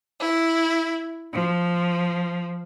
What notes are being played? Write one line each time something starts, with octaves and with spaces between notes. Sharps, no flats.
E4
F3